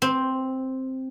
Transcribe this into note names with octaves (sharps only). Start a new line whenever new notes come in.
C4